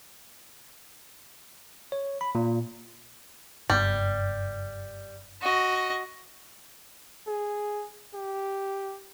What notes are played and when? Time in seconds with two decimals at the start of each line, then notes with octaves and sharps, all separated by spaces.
1.92 C#5
2.21 B5
2.35 A#2
3.70 F#1 G2 G3 B3
5.42 F#4 D#5
7.27 G#4
8.14 G4